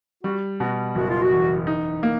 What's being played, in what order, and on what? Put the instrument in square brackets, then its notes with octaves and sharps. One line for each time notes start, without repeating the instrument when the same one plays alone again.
[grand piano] G3 [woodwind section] F#4
[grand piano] B2 [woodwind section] F#4
[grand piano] F#1 [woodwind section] F#4
[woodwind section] F4
F#4
[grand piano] E2
D#4
A#3